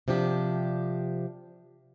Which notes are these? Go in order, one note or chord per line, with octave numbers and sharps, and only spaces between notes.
C3 F3 D4 G4